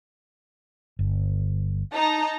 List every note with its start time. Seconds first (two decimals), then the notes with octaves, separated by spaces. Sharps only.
0.99 G1
1.93 D#4 A5 A#5